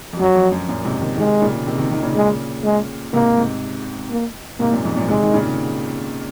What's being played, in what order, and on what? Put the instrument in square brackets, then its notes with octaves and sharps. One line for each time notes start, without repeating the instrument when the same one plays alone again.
[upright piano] F2
[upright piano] F#2 [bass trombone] F#3
[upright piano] F2
F#2
F#2 A#2
G#2 C3
C3 D#3
[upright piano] C3 D#3 [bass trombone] G#3
[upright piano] A#2 C#3
C3 D#3
C3 D#3
C3 D#3
A#2 C#3
[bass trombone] G#3
G#3
[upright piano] G#2 C3 [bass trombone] A#3
[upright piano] G#2 C3
[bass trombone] A#3
[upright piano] G#2 C3 [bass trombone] A#3
[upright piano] F#2 A#2
F2 G#2
F#2 A#2
[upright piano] G#2 C3 [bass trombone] G#3
[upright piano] D#3
A#2 C#3